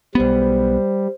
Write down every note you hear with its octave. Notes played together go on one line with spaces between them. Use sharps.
B1 G3 B3 C5